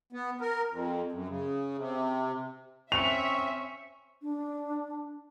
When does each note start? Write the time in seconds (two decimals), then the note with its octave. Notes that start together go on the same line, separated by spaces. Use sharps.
0.13 B3
0.41 A#4
0.71 F2
1.12 F#2
1.28 C#3
1.77 C3
2.92 C4 C#4 E5 C#6 C#7 F7
4.22 D4